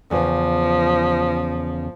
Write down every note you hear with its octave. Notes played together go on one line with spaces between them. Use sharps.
E2 C#3 F3